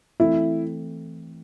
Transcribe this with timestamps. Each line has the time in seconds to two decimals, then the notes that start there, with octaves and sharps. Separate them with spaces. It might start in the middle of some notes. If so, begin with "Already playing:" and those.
0.20 E3 A3 C4 E4